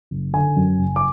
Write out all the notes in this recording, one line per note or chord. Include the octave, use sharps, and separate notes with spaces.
F#1
D3 G#5
F#2
F#1
D6